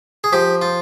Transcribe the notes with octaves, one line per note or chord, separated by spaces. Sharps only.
G#4
F3 G4
F4